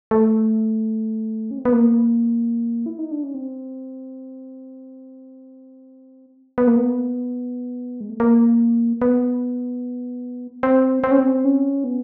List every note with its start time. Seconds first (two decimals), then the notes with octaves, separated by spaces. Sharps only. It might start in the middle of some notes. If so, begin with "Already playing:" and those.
0.11 A3
1.51 C#4
1.58 C4
1.65 B3
1.72 A#3
2.86 E4
2.99 D#4
3.11 D4
3.23 C#4
3.34 C4
6.58 B3
6.67 A#3
6.76 B3
8.01 G#3
8.10 A3
8.20 A#3
9.02 B3
10.63 C4
11.04 C4
11.11 C#4
11.18 C4
11.45 C#4
11.84 B3